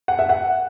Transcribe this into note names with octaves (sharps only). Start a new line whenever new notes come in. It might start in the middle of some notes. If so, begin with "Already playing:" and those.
F#5
E5
F#5